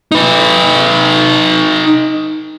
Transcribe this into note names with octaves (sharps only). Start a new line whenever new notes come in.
D#4 B4